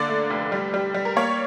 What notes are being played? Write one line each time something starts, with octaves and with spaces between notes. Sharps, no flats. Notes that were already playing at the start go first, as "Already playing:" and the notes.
Already playing: D3 A#3 D5
A3
F1
G3
G3
G3
A#4
A#3 C#5